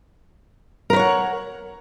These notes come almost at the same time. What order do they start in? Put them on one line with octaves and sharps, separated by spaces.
A#4 B4 C#5 F#5